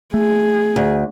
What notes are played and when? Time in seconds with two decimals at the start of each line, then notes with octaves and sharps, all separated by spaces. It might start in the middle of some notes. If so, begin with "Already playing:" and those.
0.14 A3 G#4
0.76 D2